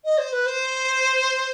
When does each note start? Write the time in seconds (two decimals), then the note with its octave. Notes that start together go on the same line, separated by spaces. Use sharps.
0.04 D#5
0.18 C5
0.32 B4
0.46 C5